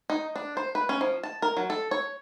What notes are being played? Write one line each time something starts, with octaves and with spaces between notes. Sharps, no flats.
D#4
D4
C5
B4
C#4
F3
A5
A#4
F#3
A4
C#5